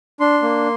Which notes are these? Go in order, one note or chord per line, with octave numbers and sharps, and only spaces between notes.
D4 C6
A#3